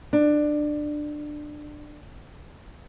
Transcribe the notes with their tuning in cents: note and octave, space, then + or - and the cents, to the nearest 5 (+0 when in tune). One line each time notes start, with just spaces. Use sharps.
D4 +20